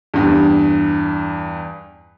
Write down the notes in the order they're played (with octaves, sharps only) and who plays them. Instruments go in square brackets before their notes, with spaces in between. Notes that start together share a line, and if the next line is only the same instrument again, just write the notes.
[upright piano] E2 G2